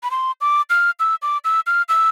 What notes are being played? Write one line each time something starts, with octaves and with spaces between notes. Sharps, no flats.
B5
C6
D6
F6
E6
D6
E6
F6
E6